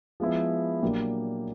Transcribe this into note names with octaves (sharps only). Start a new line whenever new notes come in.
F3 G#3 B3 E4
A#2 F#3 A#3 D4 G4